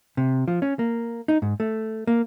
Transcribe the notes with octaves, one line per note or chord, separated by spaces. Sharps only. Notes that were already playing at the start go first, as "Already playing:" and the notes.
C3
F3
C#4
A#3
D#4
G#2
A3
A#3